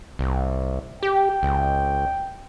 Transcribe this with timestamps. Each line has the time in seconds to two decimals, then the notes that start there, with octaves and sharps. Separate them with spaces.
0.19 C2
1.03 G4 G5
1.43 C#2